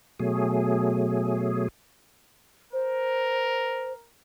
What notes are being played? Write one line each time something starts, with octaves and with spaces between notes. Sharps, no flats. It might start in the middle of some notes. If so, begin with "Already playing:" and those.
B2 F#3 A3 G#4
A#4 C5